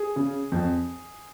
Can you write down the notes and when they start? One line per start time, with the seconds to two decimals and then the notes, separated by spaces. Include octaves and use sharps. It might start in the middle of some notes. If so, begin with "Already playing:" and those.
Already playing: G#4
0.16 C#3
0.52 F2